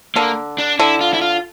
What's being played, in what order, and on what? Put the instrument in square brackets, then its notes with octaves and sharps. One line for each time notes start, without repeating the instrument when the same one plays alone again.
[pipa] D3 [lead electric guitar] A#3
[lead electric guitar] D4
[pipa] D3 [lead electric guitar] E4
[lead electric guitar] F4
E4
F4